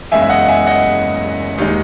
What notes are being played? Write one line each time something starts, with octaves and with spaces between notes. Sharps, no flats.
F#1 E2 C#3 G#3 E5 G#5
E5
D#5 F#5
E5 G#5
D#5 F#5
D#2 D#3 G#3